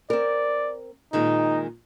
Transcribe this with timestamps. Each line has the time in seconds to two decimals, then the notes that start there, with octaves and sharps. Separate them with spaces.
0.10 C4 A#4 D5
1.13 A#2 D#3 G#3 D#4